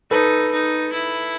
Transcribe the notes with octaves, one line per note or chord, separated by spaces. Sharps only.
D#4 A4 B4
D#4
E4